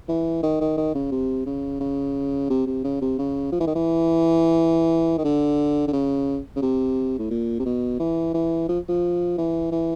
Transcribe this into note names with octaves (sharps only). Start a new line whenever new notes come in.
E3
D#3
D#3
D#3
C#3
C3
C#3
C#3
C3
C3
C#3
C3
C#3
F3
E3
D#3
E3
D#3
D3
D3
C#3
C#3
C3
A2
A#2
C3
B2
E3
E3
F3
F3
E3
E3